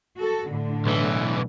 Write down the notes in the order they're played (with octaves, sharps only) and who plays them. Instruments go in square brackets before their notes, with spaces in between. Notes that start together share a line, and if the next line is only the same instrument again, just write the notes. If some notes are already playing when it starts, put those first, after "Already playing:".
[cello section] F#4 A4
A2 D3
[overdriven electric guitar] B1 E3